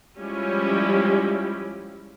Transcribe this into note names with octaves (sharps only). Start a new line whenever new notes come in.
F3 G3 G#3 C#4 E4 G4